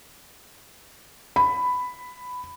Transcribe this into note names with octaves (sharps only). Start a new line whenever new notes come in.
B5